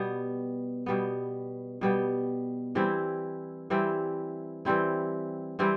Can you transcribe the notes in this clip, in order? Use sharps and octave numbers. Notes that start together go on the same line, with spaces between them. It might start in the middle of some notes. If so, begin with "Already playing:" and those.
Already playing: B2 G3 B3
B2 G3 B3
B2 G3 B3
E3 G3 C4 E4
E3 G3 C4 E4
E3 G3 C4 E4
E3 G3 C4 E4